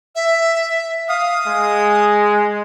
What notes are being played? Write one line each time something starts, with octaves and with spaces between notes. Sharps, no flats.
E5
F5 D#6
G#3